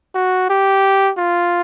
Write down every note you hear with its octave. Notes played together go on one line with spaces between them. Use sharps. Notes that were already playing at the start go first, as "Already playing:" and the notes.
F#4
G4
F4